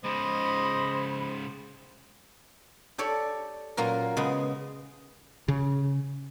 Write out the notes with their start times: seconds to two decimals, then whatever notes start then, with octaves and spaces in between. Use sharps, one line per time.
0.04 G#2 C#3 C5 D#5 B5
2.98 G4 A4 C#5 D5
3.77 A#2 F#3 A#3 C#4 A#4
4.17 C#3 G#3 B3
5.48 C#3